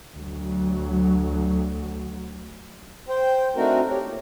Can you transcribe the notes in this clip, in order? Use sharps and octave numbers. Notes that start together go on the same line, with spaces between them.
D2 F#3
C5 G5
A3 C4 D4 D#4 F#4 A#4
G4 C#5
A#2